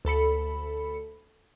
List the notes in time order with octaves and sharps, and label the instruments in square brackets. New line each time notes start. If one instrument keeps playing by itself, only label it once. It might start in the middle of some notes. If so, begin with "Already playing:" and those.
[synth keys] D2 A4 B5 C#7